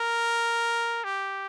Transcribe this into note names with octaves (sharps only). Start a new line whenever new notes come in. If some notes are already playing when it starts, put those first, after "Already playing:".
Already playing: A#4
G4